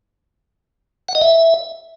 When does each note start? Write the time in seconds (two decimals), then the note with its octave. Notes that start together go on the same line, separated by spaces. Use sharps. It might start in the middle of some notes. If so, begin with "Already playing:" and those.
1.09 F#5
1.15 D#5
1.21 E5